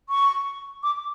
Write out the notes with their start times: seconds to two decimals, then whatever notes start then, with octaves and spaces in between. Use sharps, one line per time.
0.09 C#6
0.83 D6